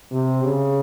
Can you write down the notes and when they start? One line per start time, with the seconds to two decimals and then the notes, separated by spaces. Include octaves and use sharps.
0.12 C3
0.44 C#3